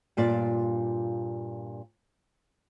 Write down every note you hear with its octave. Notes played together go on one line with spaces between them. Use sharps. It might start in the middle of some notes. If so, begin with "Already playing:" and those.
G2 A#2 F4 D5